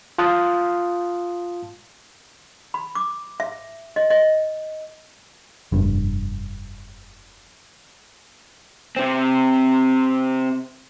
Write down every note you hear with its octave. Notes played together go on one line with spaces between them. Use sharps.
F4 F5 A5 C6 D#6 F#6
B5
D6
E5
D#5
D#5
F1 G2
C3 C4